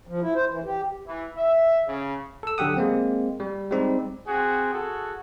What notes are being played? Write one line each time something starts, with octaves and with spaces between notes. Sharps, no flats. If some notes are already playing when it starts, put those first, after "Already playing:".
F3
E4
C5
E3
G4
E3
E5
C#3
A4 E6
D3 F#3 G4 F#5 D#6
G#3 A#3 C4
G3
G3 G#3 C4 D#4 G4
C4 F#4 G#4
F#4 G#4 A4